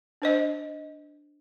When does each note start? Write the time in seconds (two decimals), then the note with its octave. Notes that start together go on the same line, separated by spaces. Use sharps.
0.22 D4 C5 D#5